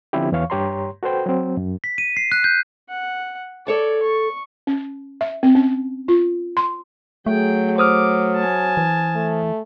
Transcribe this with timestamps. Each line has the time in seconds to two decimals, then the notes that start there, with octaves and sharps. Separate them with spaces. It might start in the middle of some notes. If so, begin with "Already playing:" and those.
0.13 D3 F3 C4 C#4 E4 G4
0.32 E2 E3 C#5 F5 C#6
0.50 G2 G4 C#5 A#5 C6
1.03 F#4 A4 B4 C5 G5
1.26 F#3 C4
1.57 F#2
1.84 B6
1.98 D#7
2.17 C7
2.32 F#6
2.44 G6
2.89 F#5
3.67 A4 C#5 D5 A5
4.02 C#6
4.67 C#4
5.21 E5
5.43 C4
5.55 C#4
6.08 F4
6.57 C6
7.26 F#3 A3 G#4 G5
7.78 C5 D6 D#6 F6
8.36 G#5 A5
8.77 E3
9.15 A3